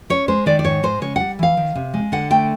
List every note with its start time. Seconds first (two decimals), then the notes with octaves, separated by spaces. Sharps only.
0.10 C#4 C#5
0.28 G#3 C5
0.46 D#3 D5
0.59 D5
0.65 G#2 C#5
0.83 G#3 C5
1.01 C#3 C#5
1.16 G3 F#5
1.39 E3 F5
1.57 D#3
1.75 C3
1.94 G#3
2.12 D3 F#5
2.30 A3 G5